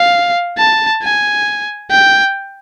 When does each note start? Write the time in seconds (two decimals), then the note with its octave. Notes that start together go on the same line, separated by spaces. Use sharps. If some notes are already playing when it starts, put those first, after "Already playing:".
Already playing: F5
0.58 A5
1.03 G#5
1.91 G5